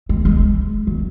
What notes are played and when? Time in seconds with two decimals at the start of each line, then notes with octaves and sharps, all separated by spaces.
0.09 G#3
0.25 G#3
0.87 F#3